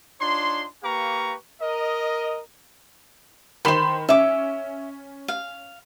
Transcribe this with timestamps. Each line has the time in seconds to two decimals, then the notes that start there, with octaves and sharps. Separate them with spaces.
0.20 D4 D#4 F4 C#5 C6
0.83 A#3 G4 B4 F5 A#5 C#6
1.61 A#4 D#5
3.65 D#3 C5 B5 C6 E7
4.09 C#4 E5 D6
5.28 F5